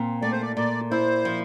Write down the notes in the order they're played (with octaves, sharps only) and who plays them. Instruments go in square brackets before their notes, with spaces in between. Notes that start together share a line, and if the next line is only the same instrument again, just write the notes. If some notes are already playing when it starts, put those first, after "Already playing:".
Already playing: [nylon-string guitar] A#2 C4
[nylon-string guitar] A3 [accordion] D5
[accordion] C5
D5
[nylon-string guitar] A#2 [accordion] D5
[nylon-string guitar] E4 [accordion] C5
[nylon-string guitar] F3